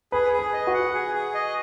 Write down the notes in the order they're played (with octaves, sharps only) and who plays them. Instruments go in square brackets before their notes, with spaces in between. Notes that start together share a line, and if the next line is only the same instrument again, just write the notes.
[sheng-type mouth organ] G#4 [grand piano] B4
[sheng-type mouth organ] G#4
[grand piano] B4
[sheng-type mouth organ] D#5
[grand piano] F#4
[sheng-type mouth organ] F#5
G#4
G#4
D#5